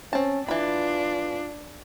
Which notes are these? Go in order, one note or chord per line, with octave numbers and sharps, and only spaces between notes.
C4 C#4 A5
E3 D4 F4 B5